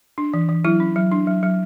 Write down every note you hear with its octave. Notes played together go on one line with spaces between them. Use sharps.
D4
E3
E3
F#3 E4
C#4
F#3
D4
F#3
F#3